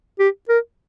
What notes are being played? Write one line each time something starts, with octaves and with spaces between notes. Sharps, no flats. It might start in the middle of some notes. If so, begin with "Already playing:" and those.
G4
A#4